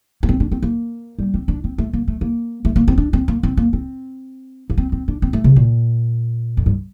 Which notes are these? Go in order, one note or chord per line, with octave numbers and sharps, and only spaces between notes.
A#3
C4
D4
C4
A#3
G3
C4
D4
C4
A3
A#3
A3
A#3
A3
A#3
C4
D4
C4
A#3
C4
A#3
C4
A#3
C4
C4
D4
C4
A3
C3
A#2
F2
G2